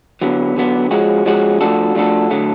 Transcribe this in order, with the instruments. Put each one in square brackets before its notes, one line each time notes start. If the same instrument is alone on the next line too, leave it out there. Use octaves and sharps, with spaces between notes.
[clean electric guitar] D3 F#3 B3
D3 F#3 B3
F3 G#3 C#4 F#4
F3 G#3 C#4 F#4
F3 A3 D4 F#4 A4
F3 A3 D4 F#4 A4
D3 F#3 A3